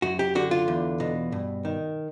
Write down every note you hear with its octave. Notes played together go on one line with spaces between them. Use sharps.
F#2 F#4
G4
D3 F#4
F4
E2
B2
G2
D#3